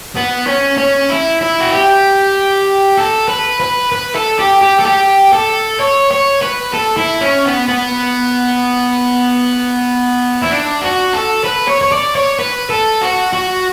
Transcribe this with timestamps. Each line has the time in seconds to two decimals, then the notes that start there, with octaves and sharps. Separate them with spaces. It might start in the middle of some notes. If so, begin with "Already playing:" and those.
0.16 B3
0.47 C#4
0.78 C#4
1.09 E4
1.41 E4
1.60 F#4
1.72 G4
2.97 A4
3.28 B4
3.60 B4
3.92 B4
4.15 A4
4.39 G4
4.62 G4
4.80 A4
4.86 G4
5.33 A4
5.80 C#5
6.11 C#5
6.42 B4
6.74 A4
6.97 E4
7.21 C#4
7.45 B3
7.68 B3
10.42 E4
10.51 D4
10.82 F#4
11.14 A4
11.45 B4
11.68 C#5
11.81 C#5
11.92 D5
12.15 C#5
12.39 B4
12.70 A4
13.02 F#4
13.33 F#4